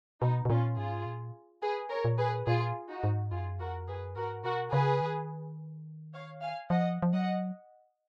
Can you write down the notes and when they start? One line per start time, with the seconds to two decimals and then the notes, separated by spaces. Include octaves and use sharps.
0.21 B2 B3 D#4
0.45 B2
0.49 A#2 C#4 F4
0.77 G#2 F4 G#4
1.06 A#2
1.62 G#4 B4
1.90 A#4 C#5
2.05 A#2
2.18 G#4 B4
2.47 A#2 F4 G#4
2.89 D#4 F#4
3.04 G#2
3.32 F#2 F4 G#4
3.59 F2 F#4 A#4
3.88 F#2 G#4 B4
4.16 G#2 F#4 A#4
4.44 B2 F#4 A#4
4.72 C#3 G#4 B4
5.01 D#3
6.14 C#5 F5
6.42 F5 G#5
6.70 F3 D#5 F#5
7.02 F3
7.13 F#3 D#5 F#5